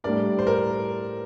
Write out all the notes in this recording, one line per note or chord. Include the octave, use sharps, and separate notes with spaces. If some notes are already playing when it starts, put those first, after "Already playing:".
A2 G3 D4 A#4 D5
C5
A#4